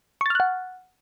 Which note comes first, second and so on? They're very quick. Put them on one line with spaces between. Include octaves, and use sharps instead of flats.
C#6 A6 F6 F#6 F#5